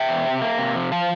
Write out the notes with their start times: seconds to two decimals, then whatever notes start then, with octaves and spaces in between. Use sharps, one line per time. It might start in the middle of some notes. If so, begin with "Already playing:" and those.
Already playing: E5 G5
0.09 E2
0.26 C3
0.42 A#3
0.58 C3
0.76 F3
0.92 F3 F5 A5